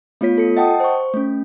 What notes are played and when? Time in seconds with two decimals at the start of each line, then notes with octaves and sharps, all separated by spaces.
0.21 A3 B3 F4 C#5 B6
0.36 F4 A4 C#7
0.57 D#5 F#5 G5 A5 D#6
0.80 C5 C#6
1.14 A3 C#4